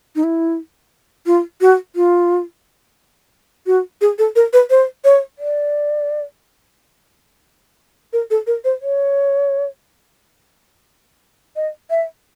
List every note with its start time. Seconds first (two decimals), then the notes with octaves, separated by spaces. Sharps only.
0.16 D#4
0.24 E4
1.26 F4
1.61 F#4
1.96 F4
3.67 F#4
4.01 G#4
4.19 A4
4.36 A#4
4.53 B4
4.70 C5
5.04 C#5
5.39 D5
8.13 A#4
8.31 A4
8.47 A#4
8.64 C5
8.82 C#5
11.56 D#5
11.90 E5